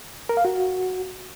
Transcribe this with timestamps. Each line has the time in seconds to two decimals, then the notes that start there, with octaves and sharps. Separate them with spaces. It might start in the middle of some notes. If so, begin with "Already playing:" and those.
0.29 A#4
0.37 F5
0.45 F#4